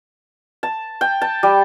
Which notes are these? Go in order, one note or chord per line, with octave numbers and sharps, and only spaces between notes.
A5
G5
A5
G3